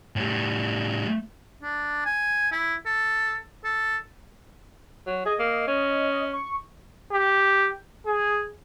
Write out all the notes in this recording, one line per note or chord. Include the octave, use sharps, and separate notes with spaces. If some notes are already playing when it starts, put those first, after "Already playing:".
A2 G3
D4
G#5
E4
A4
A4
F#3
G#4 D#5
A#3
C#4
C#6
G4
G#4